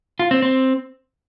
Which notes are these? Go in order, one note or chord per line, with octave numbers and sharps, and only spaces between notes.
F4
C4
C4